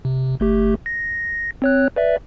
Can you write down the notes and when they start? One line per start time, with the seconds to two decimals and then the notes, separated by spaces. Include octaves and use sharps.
0.05 C3
0.40 G1 A3 G4
0.86 A#6
1.62 C4 C#5 F#6
1.96 B4 D5 E5